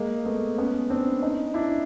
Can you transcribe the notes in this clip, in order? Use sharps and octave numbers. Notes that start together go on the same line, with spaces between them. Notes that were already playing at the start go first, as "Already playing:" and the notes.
Already playing: G#3 A#3
A3 B3
B3 C#4
C4 D4
C#4 D#4
D4 E4